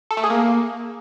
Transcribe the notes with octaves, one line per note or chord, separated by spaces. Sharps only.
A4
A3
G#4
A#3